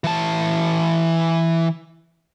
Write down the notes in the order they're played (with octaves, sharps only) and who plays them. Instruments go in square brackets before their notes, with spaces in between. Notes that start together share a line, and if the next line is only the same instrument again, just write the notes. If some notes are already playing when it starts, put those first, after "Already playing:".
[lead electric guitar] E3 A5